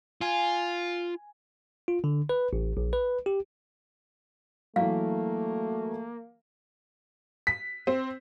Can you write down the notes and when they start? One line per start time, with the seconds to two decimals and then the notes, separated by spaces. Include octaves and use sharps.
0.21 F4 G#5
1.88 F4
2.04 D3
2.29 B4
2.53 A1
2.77 A#1
2.93 B4
3.26 G4
4.76 E3 F#3 A3 A#3 F5
7.47 B6
7.87 C4